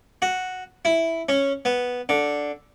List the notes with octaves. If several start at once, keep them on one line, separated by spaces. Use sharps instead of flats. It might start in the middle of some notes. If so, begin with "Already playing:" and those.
F#4
E4
C#4
B3
D3